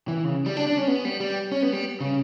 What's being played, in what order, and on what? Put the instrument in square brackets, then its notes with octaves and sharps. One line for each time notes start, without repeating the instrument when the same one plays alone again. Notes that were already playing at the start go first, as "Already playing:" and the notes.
[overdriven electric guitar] E3
C#3
G3
D4
D4
C#4
B3
G3
G3
C#4
B3
G3
C#3